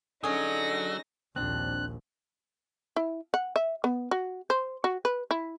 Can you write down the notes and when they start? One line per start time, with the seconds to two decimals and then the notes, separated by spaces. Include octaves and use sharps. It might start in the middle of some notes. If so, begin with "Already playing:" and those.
0.24 D3 F#3 C#4 D#4 G#4 A#6
1.36 A#1 D#2 C4 D4 F#6
2.96 E4
3.34 F#5
3.56 E5
3.84 B3
4.11 F#4
4.50 C5
4.84 F#4
5.05 B4
5.31 E4